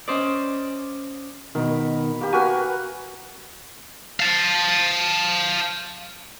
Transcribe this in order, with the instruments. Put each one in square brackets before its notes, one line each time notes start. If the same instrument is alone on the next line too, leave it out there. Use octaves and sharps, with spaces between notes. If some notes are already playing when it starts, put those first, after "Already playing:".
[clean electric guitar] C#4 C5 D5 [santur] D#5
[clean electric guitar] B2 D#3 [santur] A#4 B5
[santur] A#3 G4
[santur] F#4 A#4 B4 [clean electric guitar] G#5
[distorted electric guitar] F5 A5